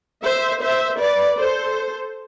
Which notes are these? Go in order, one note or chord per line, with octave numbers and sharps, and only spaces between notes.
C5 E5
C5 E5
B4 D5
A4 C5